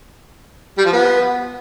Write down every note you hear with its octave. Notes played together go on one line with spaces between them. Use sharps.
G3
F3
B3